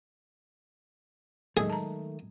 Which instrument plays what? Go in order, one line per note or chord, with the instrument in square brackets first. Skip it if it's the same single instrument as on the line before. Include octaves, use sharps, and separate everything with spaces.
[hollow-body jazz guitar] D#3 A3 [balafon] F#3 G#3 D#5 [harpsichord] G#4
[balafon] A5 A#5